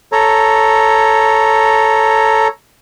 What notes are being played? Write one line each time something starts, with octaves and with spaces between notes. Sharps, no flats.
A4 C#5 A#5